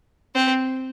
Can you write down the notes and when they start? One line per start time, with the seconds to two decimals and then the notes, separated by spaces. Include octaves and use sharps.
0.35 C4